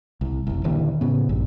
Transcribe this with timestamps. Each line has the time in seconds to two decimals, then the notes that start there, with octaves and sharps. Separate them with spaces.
0.21 C2
0.47 F1 C2
0.64 D#1 D#2 D3 E3
1.01 A2 C#3 B3
1.29 A#1 G2